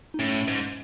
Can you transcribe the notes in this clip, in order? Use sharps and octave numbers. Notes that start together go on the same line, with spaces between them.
D#4
A2 C#4
G#2